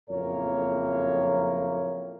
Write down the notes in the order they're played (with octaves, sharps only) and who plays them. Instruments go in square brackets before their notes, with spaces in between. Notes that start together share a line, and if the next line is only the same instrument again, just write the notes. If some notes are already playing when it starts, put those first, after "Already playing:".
[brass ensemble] F#1 F2 A2 A#3 A#4 C#5